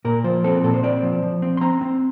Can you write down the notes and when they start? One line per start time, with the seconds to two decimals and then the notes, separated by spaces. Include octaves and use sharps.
0.05 A#2 A#4
0.24 F3 C5
0.44 C4 A4
0.64 A#2 A4
0.74 C5
0.83 C4 D5
1.03 F3
1.23 F3
1.42 C4
1.57 C6
1.61 C4 A#5
1.81 C4